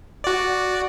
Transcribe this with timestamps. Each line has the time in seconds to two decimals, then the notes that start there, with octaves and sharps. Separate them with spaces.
0.24 F#4 D5